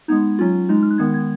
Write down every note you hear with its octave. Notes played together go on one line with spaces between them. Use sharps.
G#3 B3 D#4 G#6
F#3 C#4 F4
G#3 D#4
F6
F#6
D#3 G#3 B3 G#6
G#6